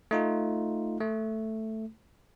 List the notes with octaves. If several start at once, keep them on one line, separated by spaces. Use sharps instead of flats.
A3 D#4 F4
A3